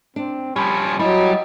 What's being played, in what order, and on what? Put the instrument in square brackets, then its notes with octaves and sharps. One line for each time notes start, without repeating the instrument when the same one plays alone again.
[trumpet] C4 [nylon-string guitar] D4
[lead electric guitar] F3 C#4 [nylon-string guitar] G3 [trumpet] B5
[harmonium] F#3 [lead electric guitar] G3 [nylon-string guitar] E4 [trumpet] D#5